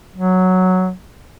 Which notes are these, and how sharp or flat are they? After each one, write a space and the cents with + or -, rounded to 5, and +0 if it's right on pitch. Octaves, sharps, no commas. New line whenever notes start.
F#3 +0